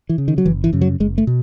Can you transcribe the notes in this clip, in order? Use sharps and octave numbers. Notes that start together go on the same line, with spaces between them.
E3
C#3
D#3
F#3
F#1 E3
E3
F#2 C#3
F#3
F#1 G#3
A3
B2